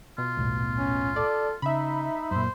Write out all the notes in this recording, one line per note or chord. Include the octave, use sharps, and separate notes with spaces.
B2 F4
D#1 B1 A2
C#4
A4 D5
C#3 D#4 E5 B5
F#2 A#2 C5